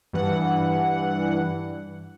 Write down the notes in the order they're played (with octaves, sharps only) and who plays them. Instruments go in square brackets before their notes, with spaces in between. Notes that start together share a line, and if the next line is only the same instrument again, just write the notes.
[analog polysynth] G2 E3 F#5